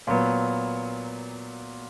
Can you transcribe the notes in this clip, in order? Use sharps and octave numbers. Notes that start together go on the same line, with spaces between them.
A#2 F#3 B3